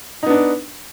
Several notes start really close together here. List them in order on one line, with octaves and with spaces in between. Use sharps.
D#4 B3 D4